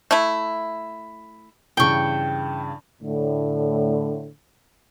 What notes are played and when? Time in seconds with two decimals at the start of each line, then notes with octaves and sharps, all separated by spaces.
0.11 A3 E4
1.77 G2 C#3 E3 G5 C#6
3.01 A2 D3